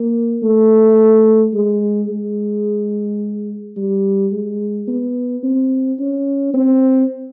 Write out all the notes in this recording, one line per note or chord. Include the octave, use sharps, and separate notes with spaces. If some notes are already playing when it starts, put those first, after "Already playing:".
Already playing: A#3
A3
G#3
G#3
G3
G#3
B3
C4
C#4
C4